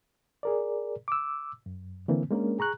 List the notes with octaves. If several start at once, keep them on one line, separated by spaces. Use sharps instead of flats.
G#4 A#4 D5
D6 E6
F#2
D3 E3 A#3 C4
G#3 A#3 C#4 D4 A#4
G#4 A#5 C#6 F#6